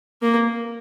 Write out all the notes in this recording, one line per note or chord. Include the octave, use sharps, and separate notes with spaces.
A#3